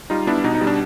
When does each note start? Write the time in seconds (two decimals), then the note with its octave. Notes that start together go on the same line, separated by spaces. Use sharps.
0.10 G3 D#4 F4
0.27 B3 D4 E4
0.44 B2 D#4
0.55 D#4
0.61 G3
0.67 D4